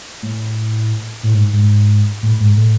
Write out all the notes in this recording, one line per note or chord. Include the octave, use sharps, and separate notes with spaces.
A2
A2
G#2
G#2
A2
G#2
A2